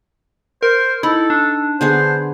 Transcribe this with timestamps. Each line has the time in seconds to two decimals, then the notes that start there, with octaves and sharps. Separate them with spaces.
0.63 A#4 C5
1.03 D#4 E4 A4
1.30 D4
1.81 D3 B3 G#4 C5